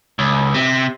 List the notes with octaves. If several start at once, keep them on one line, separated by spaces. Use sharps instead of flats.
C#2
C3